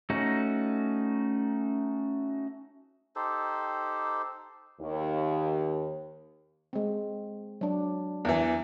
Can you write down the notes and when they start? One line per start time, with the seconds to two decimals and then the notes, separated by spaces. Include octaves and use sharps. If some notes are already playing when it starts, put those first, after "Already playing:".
0.10 A3 C#4 D#4 F#4
3.16 D#4 G4 A4 C5
4.81 D#2
6.73 G#3 C4
7.61 F#3 D4
8.25 E2 E3